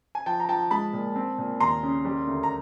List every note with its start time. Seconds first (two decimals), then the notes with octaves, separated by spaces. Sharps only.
0.15 G#5
0.26 F3 G5 A5
0.40 A#5
0.49 F3 G5 A5
0.71 G#3 A5 B5
0.93 A#2
1.16 C4
1.38 A#2
1.60 D#2 A#5 C6
1.83 C#3
2.05 G3
2.27 D2
2.43 A#5